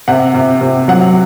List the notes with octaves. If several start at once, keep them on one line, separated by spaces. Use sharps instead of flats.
C3 F#5
C3
C3
F#3 F#5